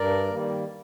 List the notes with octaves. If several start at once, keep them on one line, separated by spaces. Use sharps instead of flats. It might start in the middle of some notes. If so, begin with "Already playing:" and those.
Already playing: G2 A#4 D5
D#3 G3 A#3